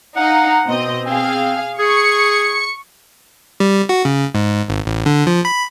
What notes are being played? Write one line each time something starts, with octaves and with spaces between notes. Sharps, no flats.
D#4 F5 F#5
B2 C4 D#5
C4 G#4 F5
G#4 C#6 C#7
G3
F#4
C#3
G#2
G#1
A1
D3
F3
B5